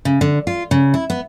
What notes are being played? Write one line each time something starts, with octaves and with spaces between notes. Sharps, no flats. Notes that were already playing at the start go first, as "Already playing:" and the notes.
C#3
D3
F4
C#3
E4
B3